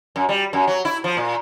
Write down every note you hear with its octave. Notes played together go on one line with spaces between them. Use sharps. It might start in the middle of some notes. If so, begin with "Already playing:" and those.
F#2
G3
F#2
F#3
E4
F3
A#2